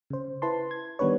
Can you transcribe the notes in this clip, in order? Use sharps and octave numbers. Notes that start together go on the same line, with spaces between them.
C#3 C5
E4 B4 A5 C6
G#6
D#3 G3 B3 D4 B4 C#5